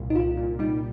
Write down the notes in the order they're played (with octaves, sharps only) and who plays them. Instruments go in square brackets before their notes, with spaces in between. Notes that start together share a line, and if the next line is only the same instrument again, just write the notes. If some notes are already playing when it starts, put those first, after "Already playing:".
Already playing: [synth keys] C2 A#2
[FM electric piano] D#4
[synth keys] C2 [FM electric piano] F4
[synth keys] A#2
[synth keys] G3 [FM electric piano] D#4